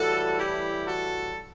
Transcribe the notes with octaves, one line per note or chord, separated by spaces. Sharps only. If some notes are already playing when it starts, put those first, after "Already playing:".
Already playing: A2 E3 G3 F#4 A4
E4 G4
F#4 A4